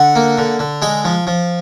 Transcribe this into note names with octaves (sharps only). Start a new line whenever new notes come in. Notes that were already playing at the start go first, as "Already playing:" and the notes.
Already playing: D3 F#5
A#3
D3
D3
G#3 G5
F3
F3